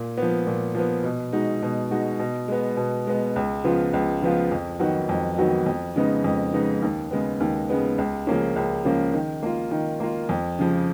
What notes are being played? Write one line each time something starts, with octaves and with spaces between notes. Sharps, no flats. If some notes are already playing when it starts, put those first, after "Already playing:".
Already playing: A#2
F3 B3
A#2
F3 B3
B2
G#3 D#4 F#4
B2
G#3 D#4 F#4
B2
G#3 B3
B2
G#3 B3
C#2
C#3 F3 B3 F4
C#2
C#3 F3 B3 F4
F2
D#3 F#3 B3 F#4
F2
D#3 F#3 B3 F#4
F2
C#3 G#3 B3 D#4
F2
C#3 G#3 B3 D#4
D#2
C#3 G#3 B3
D#2
C#3 G#3 B3
C#2
C#3 F3 A#3 C#4
C#2
C#3 F3 A#3 C#4
D#3
A#3 F4
D#3
A#3 F4
F2
C#3 F3